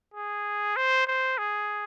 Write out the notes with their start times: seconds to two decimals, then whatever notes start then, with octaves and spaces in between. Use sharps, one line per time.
0.14 G#4
0.76 C5
1.07 C5
1.38 G#4